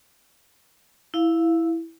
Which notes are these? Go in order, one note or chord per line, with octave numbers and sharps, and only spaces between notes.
E4 F5